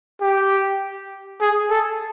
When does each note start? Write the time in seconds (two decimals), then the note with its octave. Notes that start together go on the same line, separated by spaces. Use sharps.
0.21 G4
1.41 G#4
1.70 A4